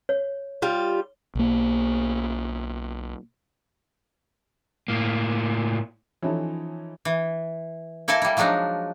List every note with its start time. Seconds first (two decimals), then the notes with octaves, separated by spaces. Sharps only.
0.09 C#5
0.62 G3 F4
1.35 B1 A#3
4.88 A2 A#3
6.22 E3 F3 C#4 D#4 E4 A4
7.05 E3
8.08 A#3 E4 A4 A#4 G#5 A5
8.22 G3 E4
8.37 F3 F#3 G#3 D4 D#4